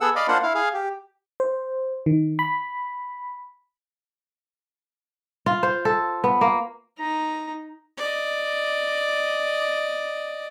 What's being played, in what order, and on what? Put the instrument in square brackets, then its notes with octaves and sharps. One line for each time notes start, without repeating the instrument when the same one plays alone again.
[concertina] B3 G#4 A4 F#5 E6
D5 D#5 F5 B5
A#3 D4 F4 C5 F#5
E4 F5
G#4 F5
G4
[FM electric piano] C5
D#3
B5
[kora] F4
C5
A4
B3
A#3
[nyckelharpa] D#4 A#5
D5 D#5